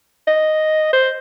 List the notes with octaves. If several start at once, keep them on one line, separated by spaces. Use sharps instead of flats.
D#5
C5